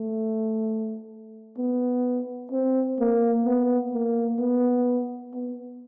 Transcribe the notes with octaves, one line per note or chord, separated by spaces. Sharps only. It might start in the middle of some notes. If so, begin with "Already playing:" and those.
Already playing: A3
B3
C4
A#3
B3
A#3
B3
B3